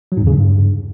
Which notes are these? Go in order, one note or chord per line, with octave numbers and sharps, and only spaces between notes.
F#3
G#2
E2
C#3
G2